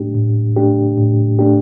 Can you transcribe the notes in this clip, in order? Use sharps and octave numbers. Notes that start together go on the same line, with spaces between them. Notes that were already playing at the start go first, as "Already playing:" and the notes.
Already playing: A2 A3 D4 G4
A2
A3 D4 G4
A2
A3 D4 G4